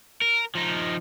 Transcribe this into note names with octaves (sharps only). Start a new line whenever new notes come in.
A#4
F3 D#4